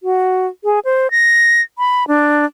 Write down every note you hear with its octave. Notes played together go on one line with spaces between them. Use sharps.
F#4
G#4
C5
A#6
B5
D4